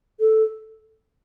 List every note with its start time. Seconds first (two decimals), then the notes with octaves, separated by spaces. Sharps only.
0.20 A4